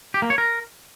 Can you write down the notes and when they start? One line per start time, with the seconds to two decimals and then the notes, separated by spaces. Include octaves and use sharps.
0.14 G4
0.22 A#3
0.30 C#5
0.38 A#4